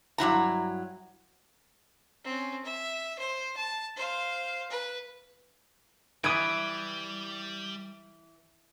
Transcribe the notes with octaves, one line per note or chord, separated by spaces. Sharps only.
G2 F#3 E4 A#5
C4 C#4
E5
C5
A5
C5 F5
B4
E3 G3 D#6 G#6 D7